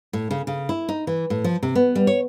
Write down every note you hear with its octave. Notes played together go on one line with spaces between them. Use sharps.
A2
C#3
C#3
E4
D#4
E3
A2
F3
C3
B3
G3
C#5